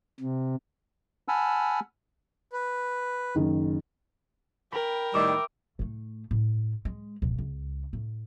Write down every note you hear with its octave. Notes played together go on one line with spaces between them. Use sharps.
C3
F#5 G#5 A5 B5 E6 F6
B4
F#1 D#3
A#4 G5 B5
A2 D#3 G3 E5 D6 E6
A2 A3
A2
G#3
D1 B2
C#2
A2